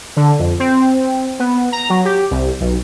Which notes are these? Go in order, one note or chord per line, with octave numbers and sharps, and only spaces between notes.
D3
F2
C4
B3
A#5
F#3
G4
C2
B1